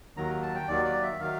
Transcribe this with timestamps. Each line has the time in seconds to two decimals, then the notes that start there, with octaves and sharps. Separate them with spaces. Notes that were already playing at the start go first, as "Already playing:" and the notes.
0.16 D#2 D#3 F#3 A#5
0.42 A5
0.55 G5
0.68 D#2 D#3 F#3 D5
0.85 D5
1.02 E5
1.20 D#3 F#3 F5